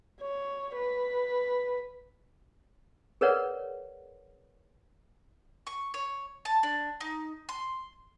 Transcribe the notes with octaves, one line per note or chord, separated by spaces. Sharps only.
C#5
B4
G#4 A#4 B4 C#5 D5 F#5
C#6
C#5
A5
D4
D#4
C6